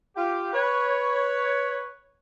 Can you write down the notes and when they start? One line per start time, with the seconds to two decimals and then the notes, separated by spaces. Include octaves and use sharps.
0.16 F4 G4
0.53 B4 C#5